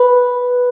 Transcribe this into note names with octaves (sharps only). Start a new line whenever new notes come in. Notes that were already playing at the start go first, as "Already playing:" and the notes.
Already playing: B4